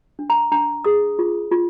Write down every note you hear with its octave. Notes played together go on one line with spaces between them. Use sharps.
D4
A#5
D4 A#5
G#4 D#6
F4
F4